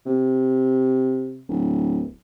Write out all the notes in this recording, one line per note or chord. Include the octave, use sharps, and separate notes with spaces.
C3
D1